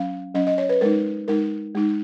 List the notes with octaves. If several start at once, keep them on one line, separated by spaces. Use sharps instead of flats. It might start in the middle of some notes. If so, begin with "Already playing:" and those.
Already playing: F#3 C#4 F5
F#3 C#4 D#5
D#5
C#5
B4
G#3 D#4 A#4
G#3 D#4 A#4
G#3 D#4